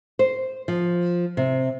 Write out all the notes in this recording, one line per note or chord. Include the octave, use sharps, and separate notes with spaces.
C5
F3
C3